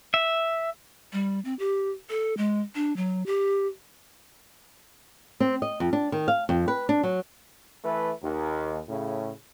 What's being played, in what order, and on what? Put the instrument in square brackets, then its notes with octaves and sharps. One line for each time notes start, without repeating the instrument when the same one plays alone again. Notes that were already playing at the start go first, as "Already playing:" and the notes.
[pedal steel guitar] E5
[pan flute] G3
C4
G4
A4
G#3
D4
F#3
G4
[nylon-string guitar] C4
D#5
F2
D4
D#3
F5
F2
B4
D4
F#3
[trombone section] E3 A3 A4 B4
D#2
A2 C#3